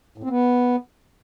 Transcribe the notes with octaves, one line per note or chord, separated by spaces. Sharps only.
A2
C4
B3